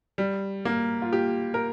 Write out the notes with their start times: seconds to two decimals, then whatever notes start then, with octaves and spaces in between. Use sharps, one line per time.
0.18 G3
0.65 A#3
1.02 F4
1.13 G4
1.54 A#4